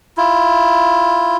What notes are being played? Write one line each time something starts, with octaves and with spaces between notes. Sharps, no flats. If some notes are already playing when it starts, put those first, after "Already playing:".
E4 F4